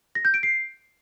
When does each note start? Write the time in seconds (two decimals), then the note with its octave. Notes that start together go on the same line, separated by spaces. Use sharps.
0.15 A#6
0.25 G6
0.34 D7
0.43 C7